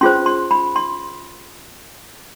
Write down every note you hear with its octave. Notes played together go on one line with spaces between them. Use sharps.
C#4 F4 G#4 C5 C6
C6
B5
C6